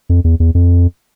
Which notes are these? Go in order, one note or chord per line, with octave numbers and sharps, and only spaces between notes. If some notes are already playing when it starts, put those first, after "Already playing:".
F2
E2
E2
F2